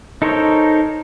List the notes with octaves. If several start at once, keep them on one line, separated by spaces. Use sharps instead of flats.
D#4 A4 A#4 C5 C#5